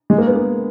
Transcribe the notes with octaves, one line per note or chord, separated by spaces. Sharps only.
G#3
A#3
B3
A#3